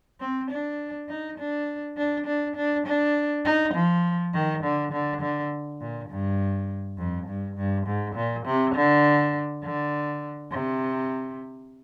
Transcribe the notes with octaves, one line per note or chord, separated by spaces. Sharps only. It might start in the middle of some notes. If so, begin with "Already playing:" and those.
C4
D4
D#4
D4
D4
D4
D4
D4
D#4
F3
D#3
D3
D3
D3
A#2
G2
F2
G2
G2
G#2
A#2
C3
D3
D3
C3